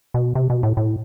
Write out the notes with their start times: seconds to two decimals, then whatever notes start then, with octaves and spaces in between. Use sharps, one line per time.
0.14 B2
0.35 C3
0.50 B2
0.63 A2
0.77 A2